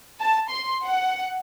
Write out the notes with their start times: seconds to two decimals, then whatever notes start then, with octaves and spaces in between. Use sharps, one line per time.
0.20 A5
0.50 C6
0.84 F#5